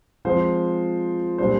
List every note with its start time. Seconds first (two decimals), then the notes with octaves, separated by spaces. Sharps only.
0.25 F3 G#3 C4 C5
1.38 A#2 G3 D4 C5